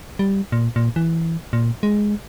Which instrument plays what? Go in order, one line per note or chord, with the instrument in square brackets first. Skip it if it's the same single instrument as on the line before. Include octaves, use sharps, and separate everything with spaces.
[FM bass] G3
A#2
A#2
E3
A#2
G#3